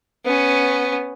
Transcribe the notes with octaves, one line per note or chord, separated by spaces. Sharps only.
B3 C#4